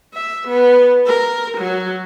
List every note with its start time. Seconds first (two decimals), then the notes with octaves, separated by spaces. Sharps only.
0.14 E5
0.48 B3
1.06 A#4
1.58 F#3